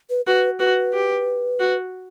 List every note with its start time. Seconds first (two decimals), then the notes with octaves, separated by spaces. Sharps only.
0.10 B4
0.27 F#4 B4
0.59 F#4 B4
0.93 G4
1.60 F#4